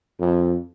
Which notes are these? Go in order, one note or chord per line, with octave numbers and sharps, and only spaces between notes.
F2